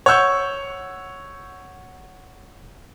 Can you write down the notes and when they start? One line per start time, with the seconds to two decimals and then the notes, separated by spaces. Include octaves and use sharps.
0.06 C#5 F#5 C#6 E6 G6